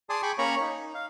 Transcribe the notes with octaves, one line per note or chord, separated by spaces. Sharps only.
G#4 D5 G#5 A5 C6 D#6
G#4 G5 B5 C#6 D6
A#3 C#4 C#5 A#5 B5 C#6
D#4
F5